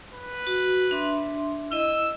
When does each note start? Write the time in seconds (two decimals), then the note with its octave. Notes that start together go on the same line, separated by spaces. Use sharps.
0.12 B4
0.47 F#4
0.91 D4 E5 C6
1.72 E4 D#5 E6